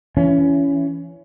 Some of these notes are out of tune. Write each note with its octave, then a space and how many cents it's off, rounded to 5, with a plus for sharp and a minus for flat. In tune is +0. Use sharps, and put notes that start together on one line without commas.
E3 +25 C#4 +20